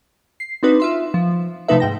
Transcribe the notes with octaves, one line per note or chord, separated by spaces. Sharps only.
C7
C4 D4 D#4 F#4 B4
F4 E5 C6
F3
C3 F3 A3 D#4 B4 E5
G#2 G5 A#6